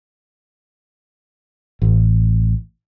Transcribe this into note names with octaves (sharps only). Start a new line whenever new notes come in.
A1